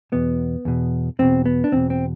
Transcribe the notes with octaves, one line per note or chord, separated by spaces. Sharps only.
E2 B2 B3
E2 B2
E2 B2 C4
B3
D4
E2 B2 C4
C4